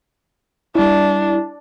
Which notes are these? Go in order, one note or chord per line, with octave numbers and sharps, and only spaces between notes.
G3 D4 E4